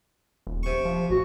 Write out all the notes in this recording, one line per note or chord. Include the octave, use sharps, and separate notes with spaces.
D#1
C3 C#6
F3
A1 F#4